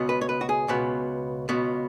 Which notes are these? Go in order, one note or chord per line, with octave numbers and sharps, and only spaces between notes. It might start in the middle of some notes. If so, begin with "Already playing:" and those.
Already playing: C#2 B2 B3
B4
C#5
B4
F#4
G#4
C#2 B2 B3
C#2 B2 B3